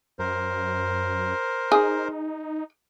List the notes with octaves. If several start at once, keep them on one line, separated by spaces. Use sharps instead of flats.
F#2 A#4 C5
D#4 G#4